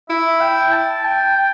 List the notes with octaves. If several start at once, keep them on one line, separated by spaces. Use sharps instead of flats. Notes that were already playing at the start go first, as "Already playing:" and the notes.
E4 E5
G5
A5
G5
G5